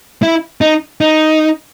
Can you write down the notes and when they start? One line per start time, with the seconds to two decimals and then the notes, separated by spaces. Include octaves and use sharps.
0.23 E4
0.61 D#4
1.01 D#4